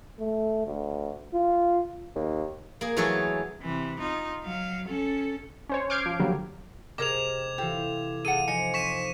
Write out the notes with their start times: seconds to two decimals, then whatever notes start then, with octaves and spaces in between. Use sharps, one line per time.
0.20 A3
0.66 D2
1.34 F4
2.16 D#2
2.81 A#3 G#4
2.97 E3 F#3 A3 G#4 A4 C#5
3.62 C3 E3
4.00 D#4 F4
4.44 F#3 F5
4.88 C#4 A4
5.69 C#4 C5 C#5
5.90 D6 F6 G6 G#6 C7 D7
6.06 F3
6.19 D3 F#3 G3 A#3
6.98 C3 G4 G#4 A#4 D#5 D6 G#6 F7
7.58 E3 F4 G4 A4
8.25 F4 G#4 A4 F#5 D#7
8.48 F3 D#4 D#5 G#5 C#7
8.74 C4 C#6 B6 E7